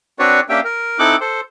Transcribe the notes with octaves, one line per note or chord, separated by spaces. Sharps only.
C4 D4 F#4 B4 C#5 D5
A#3 C#4 D4 G4 E5 G5
A#4
C4 D#4 E4 A4 D6 F#6
A4 C5